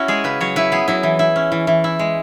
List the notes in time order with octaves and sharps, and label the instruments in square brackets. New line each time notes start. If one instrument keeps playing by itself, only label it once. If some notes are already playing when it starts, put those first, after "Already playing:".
Already playing: [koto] C#4 E4 F#4
G#3 G#4
C#3 B4
F#3 C#5
E4 B4
B3 G#4
F#3 E4
E3
E4
C#4
E3
E3
E4
G#3